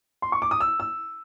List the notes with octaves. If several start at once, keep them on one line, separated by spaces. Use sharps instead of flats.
C6
C#6
D6
D#6
E6
E6